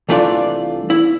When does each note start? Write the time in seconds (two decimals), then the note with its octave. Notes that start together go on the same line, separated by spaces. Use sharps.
0.09 C2 E3 A3 D4 F4 D5
0.90 E4